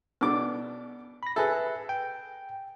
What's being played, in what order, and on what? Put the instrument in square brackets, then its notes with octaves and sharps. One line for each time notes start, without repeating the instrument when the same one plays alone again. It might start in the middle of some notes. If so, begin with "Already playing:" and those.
[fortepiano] B2 D4 D6
[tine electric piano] B5 A#6
[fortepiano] G#4 A4 [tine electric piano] B4 E5
[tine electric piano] G5